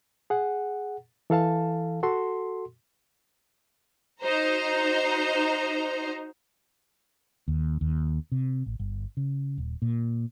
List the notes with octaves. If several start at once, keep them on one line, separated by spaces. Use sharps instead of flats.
G#4 F#5
E3 A4 F5 A5
F#4 A4 C6
D#4 F#4 C5 A#5
D#2
D#2
C3
A1
G1
C#3
D#1
A#2